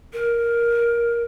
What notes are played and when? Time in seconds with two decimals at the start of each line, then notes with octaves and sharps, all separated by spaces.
0.13 A#4